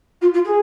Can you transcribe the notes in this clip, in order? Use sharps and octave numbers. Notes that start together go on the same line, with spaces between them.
F4
F4
G#4